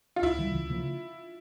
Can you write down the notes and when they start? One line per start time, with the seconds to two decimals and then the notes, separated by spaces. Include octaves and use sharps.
0.16 F4
0.22 C#2 E4
0.38 C#3 E3 G3
0.54 C#2
0.70 C#3 F3 A#3